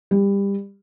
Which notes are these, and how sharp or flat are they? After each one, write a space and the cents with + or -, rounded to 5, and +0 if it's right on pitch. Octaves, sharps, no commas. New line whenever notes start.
G3 +25